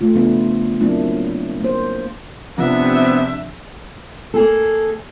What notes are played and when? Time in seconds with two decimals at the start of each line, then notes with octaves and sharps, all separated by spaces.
0.01 A3 F4
0.15 C#3 F3 B3 D4 F4 B4
0.80 F#3 A#3 C4 D4 E4 F4
1.61 A#3 C5
2.58 C3 F3 B3 D4 E5
4.34 A#3 G#4 A4